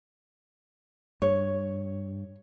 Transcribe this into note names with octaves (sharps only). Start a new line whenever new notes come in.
G2 C#5